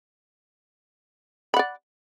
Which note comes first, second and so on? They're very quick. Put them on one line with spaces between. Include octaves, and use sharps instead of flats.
B5 F#5 D5